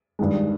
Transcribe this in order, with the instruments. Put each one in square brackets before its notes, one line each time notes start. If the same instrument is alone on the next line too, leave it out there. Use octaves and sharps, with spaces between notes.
[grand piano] G2 D#3 G#3